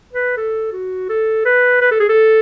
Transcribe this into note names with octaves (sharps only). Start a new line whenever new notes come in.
B4
A4
F#4
A4
B4
B4
A4
G#4
A4